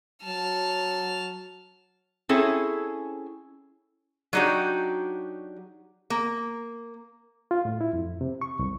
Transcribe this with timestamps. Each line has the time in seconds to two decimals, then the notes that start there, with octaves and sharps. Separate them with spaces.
0.24 F#3 A5 F6
2.29 C4 C#4 E4 G#4 A4 C#5
4.33 F#3 D4 D#4 F#4 G4
6.10 A#3
7.51 F4
7.65 A2
7.81 E4
7.93 F2
8.21 C3
8.41 C#6
8.59 C2